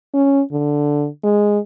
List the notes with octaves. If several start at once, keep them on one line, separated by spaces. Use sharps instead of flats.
C#4
D3
G#3